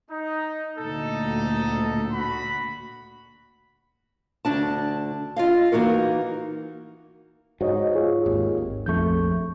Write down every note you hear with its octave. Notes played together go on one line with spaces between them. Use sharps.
D#4
D2 A#2 D#4 A4
F#4 B5
D2 D4 A5
F4 D#5 F5
E3 A#3 D#4 F#4 A#4
G#2 F#4 C#5 D#5
F4 G#4 C#5
G#1 D#2
A#1 F2 A3 C#6 G6